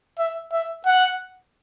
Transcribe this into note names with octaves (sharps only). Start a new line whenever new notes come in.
E5
E5
F#5